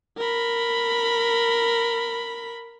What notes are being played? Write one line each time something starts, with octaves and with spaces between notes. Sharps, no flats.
A#4 B5